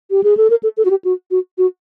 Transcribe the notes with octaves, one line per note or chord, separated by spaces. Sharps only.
G4
G#4
A4
A#4
A4
A4
F#4
G4
F#4
F#4
F#4